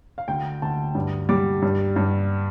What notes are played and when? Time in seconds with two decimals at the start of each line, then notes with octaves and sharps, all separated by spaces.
0.18 F5
0.28 D2 G5
0.62 D2 A5
0.95 G2
1.29 G3 D6
1.62 G2
1.96 G2